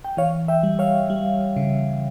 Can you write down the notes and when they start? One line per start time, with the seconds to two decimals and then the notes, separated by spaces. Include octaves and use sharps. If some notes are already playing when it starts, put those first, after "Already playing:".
0.04 G5
0.17 E3 C#5 F5
0.48 E5 G5
0.63 G3
0.79 C#5 F5
1.10 G3
1.57 C#3